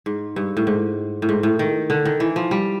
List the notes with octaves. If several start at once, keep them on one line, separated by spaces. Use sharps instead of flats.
G#2
G2
A2
G#2
A2
G#2
A2
D#3
D3
D#3
E3
F3
G3